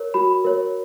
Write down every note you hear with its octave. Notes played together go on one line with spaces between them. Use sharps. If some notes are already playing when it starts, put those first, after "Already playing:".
Already playing: A#4 C#5
F#4 B5
A#4 C#5